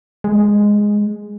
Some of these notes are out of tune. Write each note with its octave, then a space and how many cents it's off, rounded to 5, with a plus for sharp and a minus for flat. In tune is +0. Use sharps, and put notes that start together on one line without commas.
G#3 -5